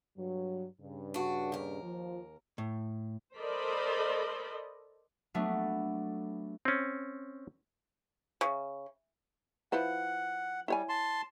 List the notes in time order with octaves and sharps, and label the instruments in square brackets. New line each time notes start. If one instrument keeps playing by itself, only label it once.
[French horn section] G2 F#3
G2 C#3
[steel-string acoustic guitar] D4 F#4
D#2 A#4
[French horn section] F3
[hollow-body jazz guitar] A2
[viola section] A4 A#4 C5 D5 D#5 B5
[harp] F#3 A3 B3 D4
[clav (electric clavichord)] C4 C#4
[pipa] C#3
[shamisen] F3 E4 B4 [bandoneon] F#5
[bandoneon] G3 [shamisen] E4 C#5 G#5
[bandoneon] A5 C6